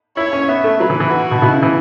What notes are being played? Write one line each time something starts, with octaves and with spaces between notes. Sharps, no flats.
E4 C#5
C#4
B3 E5
A3
F#3 B4
E3
E3
F#4
B2
B2 E4
C#3
E3